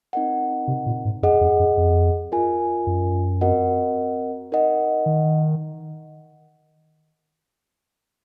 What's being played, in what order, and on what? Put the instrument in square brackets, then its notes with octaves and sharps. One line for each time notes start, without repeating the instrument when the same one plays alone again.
[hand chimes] C4 D#4 A#4 D#5 F#5
[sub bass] C3
A#2
G#2
[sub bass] F#2 [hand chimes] G#4 D#5 F#5
[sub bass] F2
F#2
F2
[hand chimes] F4 A#4 D#5 G#5
[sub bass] F#2
[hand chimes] C4 F#4 A#4 D#5 F#5
D#4 A#4 D#5 F#5
[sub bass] D#3